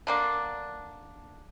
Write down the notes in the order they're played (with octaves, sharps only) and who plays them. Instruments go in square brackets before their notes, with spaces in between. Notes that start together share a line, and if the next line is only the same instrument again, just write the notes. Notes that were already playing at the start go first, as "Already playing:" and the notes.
[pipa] D3 A#3 D4